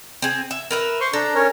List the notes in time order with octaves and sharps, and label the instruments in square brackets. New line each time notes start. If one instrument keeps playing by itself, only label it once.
[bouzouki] C4 G#4
E5
A#4 B4 E5
[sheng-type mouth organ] C5 C6 C#6
[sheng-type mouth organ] D4 A#5 [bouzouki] A4
[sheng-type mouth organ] C#4 A#4 C#5